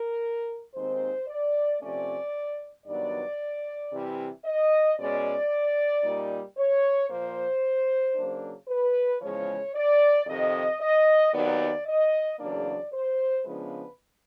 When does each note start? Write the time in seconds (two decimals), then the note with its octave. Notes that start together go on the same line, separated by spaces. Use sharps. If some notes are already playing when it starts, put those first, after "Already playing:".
Already playing: A#4
0.74 D#2 D#3 G#3 C4 C5
1.27 D5
1.80 C3 F3 A3 C#4 D5
2.86 G2 D#3 F#3 B3 D5
3.92 C3 E3 G3
4.44 D#5
4.98 B2 G#3 C#4 D5
6.03 A#2 G3 A#3 D#4
6.57 C#5
7.09 A#2 F3 A#3 C5
8.15 C#3 F#3 A#3 D4
8.68 B4
9.21 E2 C#3 F3 G#3 C#5
9.74 D5
10.27 F2 C3 D#3 D#5
10.80 D#5
11.33 D#2 D#3 F#3 B3 D5
11.86 D#5
12.38 E2 C#3 F#3 A#3 D4 D5
12.92 C5
13.44 C#3 F3 G#3 B3 D4 B4